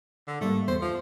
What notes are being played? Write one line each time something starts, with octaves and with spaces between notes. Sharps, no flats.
D3
G#2 G3 A3 A#3
E2 C5
F3